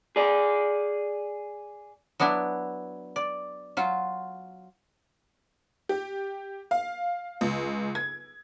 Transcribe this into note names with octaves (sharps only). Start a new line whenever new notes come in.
G#4 D5
F#3 B3 D4 E4
D5
F#3 F4
G4
F5
C#2
G#6